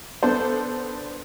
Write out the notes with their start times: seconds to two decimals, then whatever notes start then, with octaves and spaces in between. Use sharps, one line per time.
0.23 B3 D4 A4 C5